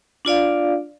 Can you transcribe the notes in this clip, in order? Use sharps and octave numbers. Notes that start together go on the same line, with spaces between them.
D4 F4 D5 F5